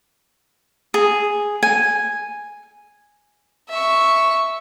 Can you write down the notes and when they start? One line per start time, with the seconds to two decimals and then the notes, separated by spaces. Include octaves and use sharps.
0.94 G#4
1.63 G#5
3.69 E5 C#6